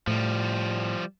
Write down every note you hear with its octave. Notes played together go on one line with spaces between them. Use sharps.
A2 F3 G3